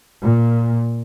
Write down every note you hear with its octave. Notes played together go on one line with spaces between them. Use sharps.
A#2